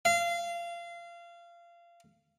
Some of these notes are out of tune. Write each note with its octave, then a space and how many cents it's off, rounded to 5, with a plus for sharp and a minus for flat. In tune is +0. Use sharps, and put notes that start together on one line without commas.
F5 -25